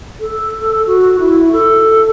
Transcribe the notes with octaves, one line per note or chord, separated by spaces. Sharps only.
A4
F#4
E4
A4